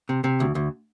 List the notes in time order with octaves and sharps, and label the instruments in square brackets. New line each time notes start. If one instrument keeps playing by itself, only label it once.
[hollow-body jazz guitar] C3
C3
D2
D2